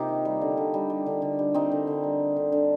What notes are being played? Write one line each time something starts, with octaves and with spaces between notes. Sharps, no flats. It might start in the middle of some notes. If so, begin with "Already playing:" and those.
Already playing: C3 A#3 D#4 F4 G4 A#4
D#3
G3
D3
D3
G3
G3
D3
D3
G3
G3 C4 D#4
D3
D3
G3
G3
D3
D3